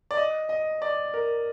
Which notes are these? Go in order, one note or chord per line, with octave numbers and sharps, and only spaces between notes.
D5
D#5
D#5
D5
A#4